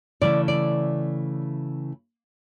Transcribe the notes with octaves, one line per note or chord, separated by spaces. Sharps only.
C#3 E3 A3 E4 D5
D5